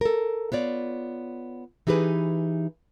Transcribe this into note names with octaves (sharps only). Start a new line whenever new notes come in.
A4 A#4
B3 F4 C#5 D5
E3 D#4 G4 G#4 B4